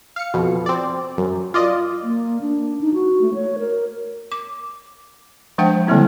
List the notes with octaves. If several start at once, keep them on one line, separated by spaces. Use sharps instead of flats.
F5 C#7
F2 B2
C4 D5
F#2
F4 D5 D#5
A#3
D4
D#4
F#4
A3
C#5
A#4
D6
F3 G#3 D4 C5 F#5 G5
D3 F#3 G3 A#3 C4 E4